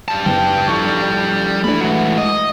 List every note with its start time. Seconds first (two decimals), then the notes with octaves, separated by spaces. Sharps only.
0.08 G3 A5
0.26 F#1 B3 G5
0.68 F3 E4 A4 C#6 G6
1.64 E3 A3 D4 B5
1.81 E3 F#3 G#3 F#5
2.18 D#5